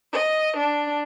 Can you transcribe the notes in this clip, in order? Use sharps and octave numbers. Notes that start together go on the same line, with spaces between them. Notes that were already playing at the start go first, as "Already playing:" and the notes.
D#5
D4